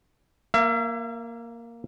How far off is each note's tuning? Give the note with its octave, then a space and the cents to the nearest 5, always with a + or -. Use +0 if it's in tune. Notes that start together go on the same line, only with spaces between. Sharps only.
A#3 +0 E5 +40